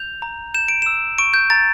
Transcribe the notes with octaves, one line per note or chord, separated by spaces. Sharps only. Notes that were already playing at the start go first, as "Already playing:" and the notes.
Already playing: G6 F7
A#5
G6 E7
D7
E6 E7
C#6 D7
G6
A#5 A6